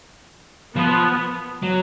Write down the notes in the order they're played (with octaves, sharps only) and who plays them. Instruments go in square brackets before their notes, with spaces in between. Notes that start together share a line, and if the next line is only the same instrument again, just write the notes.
[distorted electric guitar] F3 [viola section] B3
[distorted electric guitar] F#3